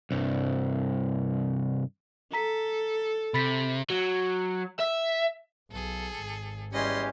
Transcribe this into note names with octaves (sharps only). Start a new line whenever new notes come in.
C2 G2
A4 A#5 B6
C3 B5 A6 B6
F#3
E5
B1 G#4 A4
G#1
E2 G3 C#4 G4 D#5 G#5 C6